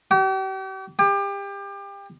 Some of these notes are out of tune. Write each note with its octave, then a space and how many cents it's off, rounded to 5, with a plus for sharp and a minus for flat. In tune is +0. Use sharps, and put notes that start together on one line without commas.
G4 -40
G4 +30